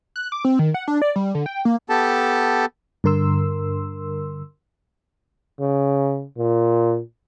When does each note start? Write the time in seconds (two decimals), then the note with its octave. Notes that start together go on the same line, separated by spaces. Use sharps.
0.16 F#6
0.32 D6
0.45 C4
0.59 D#3
0.74 F#5
0.88 D4
1.02 D5
1.16 G3
1.35 D3
1.46 G5
1.65 A#3
1.89 B3 G4 A4 A5
3.04 G2 D3 A#4 C6 E6
5.60 C#3
6.38 A#2